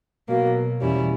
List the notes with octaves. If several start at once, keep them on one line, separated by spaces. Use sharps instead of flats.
B2 F#3 A#3
E2 B2 G3 C#4 E4